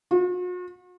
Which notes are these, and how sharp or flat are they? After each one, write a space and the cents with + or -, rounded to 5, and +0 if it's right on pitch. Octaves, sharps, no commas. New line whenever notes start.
F#4 -45